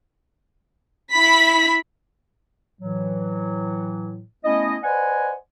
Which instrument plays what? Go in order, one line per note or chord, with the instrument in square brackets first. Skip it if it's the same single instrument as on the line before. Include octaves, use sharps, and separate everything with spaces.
[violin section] E4 B5 B6
[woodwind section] A2 E3 F#3
A3 B3 C#4 E4 D#5
B4 C5 D5 D#5 F#5 G#5